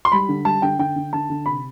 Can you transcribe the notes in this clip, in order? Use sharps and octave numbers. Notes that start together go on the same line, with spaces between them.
C6
G3 B5
D3
G3 A5
D3 G5
D3 G5
D3
D3 A5
D3
C3 B5